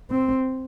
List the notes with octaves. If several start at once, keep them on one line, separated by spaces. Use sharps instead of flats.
C4